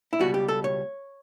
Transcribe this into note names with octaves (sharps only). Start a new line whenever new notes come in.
E4
C#2 B2 G3 F#4
G4
A4
C#5